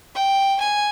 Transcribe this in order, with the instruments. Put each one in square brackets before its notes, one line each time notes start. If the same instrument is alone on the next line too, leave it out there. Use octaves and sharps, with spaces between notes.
[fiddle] G5
G#5